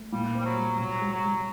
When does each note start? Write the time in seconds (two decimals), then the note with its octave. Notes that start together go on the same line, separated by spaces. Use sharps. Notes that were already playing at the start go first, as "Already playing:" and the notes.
Already playing: A3
0.13 A#2 G3
0.35 C4
0.40 G3
0.45 F#3
0.56 G3
0.79 C3 F#3
1.01 G3
1.13 F#3
1.24 G3